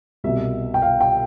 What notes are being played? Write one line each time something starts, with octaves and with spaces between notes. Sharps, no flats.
C2 B2 E5
G5
F5
G5